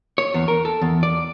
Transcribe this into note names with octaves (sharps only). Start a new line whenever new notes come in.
C#5
E2
A#4
A4
E2
D5